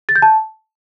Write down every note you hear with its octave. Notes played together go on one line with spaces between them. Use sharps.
A6
G6
A5